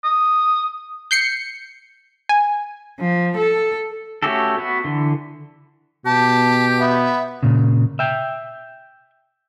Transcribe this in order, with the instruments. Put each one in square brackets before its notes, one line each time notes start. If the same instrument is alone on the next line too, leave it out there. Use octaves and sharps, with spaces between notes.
[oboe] D#6
[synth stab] G6 C7 C#7
G#5
[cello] F3
A4
[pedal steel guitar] A3 C#4 F#4 G4 A4
B3 F#4
D3 E3
[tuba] B2 [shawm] G4 [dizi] A5
[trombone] B3 [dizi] E5
[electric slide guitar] A#2 C#3
E5 G5